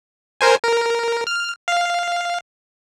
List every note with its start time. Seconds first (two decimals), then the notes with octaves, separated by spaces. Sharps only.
0.41 A#4 C5 G#5
0.64 A#4
1.27 F6
1.68 F5